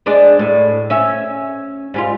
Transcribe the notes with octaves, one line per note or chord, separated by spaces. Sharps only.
G#3 D4 D5
A2
C#4 E5
G#2 G3 F4